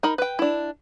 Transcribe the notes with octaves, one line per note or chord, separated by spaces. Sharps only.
D#4 A#4 B5
B4 G5
D4 E4